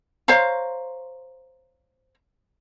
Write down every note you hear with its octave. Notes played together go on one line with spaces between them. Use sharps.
C5 C#5 F5 A#5